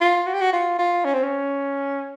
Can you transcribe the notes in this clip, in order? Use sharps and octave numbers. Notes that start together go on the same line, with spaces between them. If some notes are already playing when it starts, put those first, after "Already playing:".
F4
F#4
G4
F#4
F4
F4
C#4
C4
C#4